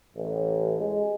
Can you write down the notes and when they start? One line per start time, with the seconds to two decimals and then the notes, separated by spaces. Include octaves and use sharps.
0.15 A1
0.79 G#3